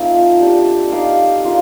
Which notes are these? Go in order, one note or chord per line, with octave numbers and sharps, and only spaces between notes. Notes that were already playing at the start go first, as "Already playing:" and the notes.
Already playing: F3 A3 C4 D#4 A4 F5
D4 G4 D5
D#4 G4 D5 F5
D4 F4 A#4